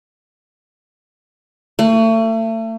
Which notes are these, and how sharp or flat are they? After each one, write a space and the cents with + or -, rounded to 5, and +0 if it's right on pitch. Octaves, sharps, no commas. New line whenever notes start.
A3 +35